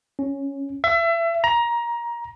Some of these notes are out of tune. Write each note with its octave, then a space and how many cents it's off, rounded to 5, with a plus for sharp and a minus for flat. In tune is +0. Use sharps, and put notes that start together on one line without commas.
C#4 +0
E5 +30
A#5 +20